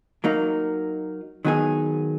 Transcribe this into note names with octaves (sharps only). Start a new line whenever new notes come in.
F#3 A#3 D#4
D#3 F#3 B3 D#4 G#4